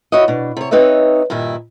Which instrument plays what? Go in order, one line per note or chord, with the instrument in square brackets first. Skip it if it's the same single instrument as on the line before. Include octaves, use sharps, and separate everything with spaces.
[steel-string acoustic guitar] E4 F#4 C#5 D#5
B2 D4
C3 C#5
C4 D#4 B4 C#5 D#5 E5
G2 A#2 D#3 E4